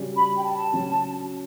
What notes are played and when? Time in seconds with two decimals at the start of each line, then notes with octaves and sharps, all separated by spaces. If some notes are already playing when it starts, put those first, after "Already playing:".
Already playing: C#3 G3 C#4 F#4
0.15 B5
0.36 G5
0.44 A5
0.73 C#3 F#3 C#4 F#4